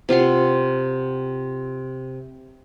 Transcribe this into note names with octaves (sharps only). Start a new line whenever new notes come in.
C3 F4 F#5 C6